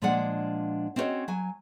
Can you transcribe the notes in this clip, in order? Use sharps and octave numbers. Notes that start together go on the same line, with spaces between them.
A#2 F3 G#3 D4 D5 F#5
C4 C#4 E4 F#4 C#5 D#5
F#3 G#5